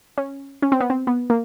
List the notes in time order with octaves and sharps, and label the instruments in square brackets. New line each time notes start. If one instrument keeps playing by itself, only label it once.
[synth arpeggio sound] C#4
C#4
C4
B3
C4
B3
A#3